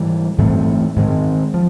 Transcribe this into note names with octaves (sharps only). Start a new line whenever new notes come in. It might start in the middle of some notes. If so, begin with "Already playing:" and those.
Already playing: G#2 E3 G3
G#2 E3 A3 C4
G#2 D#3 G#3 C4
F3